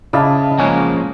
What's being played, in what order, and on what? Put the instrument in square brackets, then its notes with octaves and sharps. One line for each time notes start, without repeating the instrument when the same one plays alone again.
[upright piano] C#3 [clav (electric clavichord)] E4 D5 [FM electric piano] D#5 F5 A5
[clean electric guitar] F3 G#3 A#3 [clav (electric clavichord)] C#4 F#5 G#5